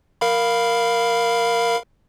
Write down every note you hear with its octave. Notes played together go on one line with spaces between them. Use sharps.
A#4 F5 B5